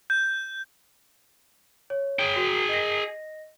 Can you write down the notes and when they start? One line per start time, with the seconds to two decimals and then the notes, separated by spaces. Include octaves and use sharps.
0.10 G6
1.90 C#5
2.19 G#4 G5
2.36 F#4
2.69 D#5 A#6